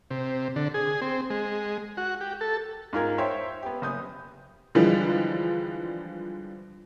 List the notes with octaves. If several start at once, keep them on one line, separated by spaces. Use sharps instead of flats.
C3
D3
G#4
C4
G#3
F#4
G4
A4
G#2 F4 A#4 G#6
C5 C#5 E5 G5 C6
B3 G4
F#1 D#6 G6
D3 E3 F3 G3 G#3